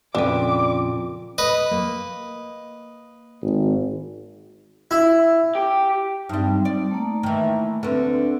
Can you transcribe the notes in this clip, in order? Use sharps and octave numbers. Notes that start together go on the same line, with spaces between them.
F2 A#2 C#3 D4 B4 D6
B4 D#5
A#3
G#1
E4
G4
G2 G3 C4 D#4
D5
A3 A#3
D#3 E3
D2 D3 C4 B4